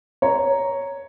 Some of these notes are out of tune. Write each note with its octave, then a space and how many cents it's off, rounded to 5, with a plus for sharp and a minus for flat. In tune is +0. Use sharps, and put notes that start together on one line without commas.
C#5 +0 A#5 +0